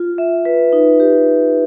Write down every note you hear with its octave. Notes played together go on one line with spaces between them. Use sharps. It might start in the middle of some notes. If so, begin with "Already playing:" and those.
Already playing: F4
E5
B4
D#4
G4